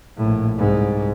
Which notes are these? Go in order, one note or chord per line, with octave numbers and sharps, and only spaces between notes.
A#1 A2
C2 G#2